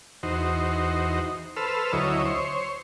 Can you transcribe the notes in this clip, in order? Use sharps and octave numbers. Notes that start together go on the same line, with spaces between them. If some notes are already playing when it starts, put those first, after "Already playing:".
E2 D#4 F#4 C5
A4 B4 C5 E6 F6
D2 F#3 E4 C#5 D#5
C5 C#5